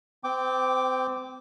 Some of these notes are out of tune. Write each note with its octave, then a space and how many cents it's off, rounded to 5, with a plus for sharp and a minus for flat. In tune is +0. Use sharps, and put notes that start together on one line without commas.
C4 -30 G5 +0 D6 +0